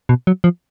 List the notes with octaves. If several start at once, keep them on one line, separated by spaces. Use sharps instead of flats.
B2
F#3
F3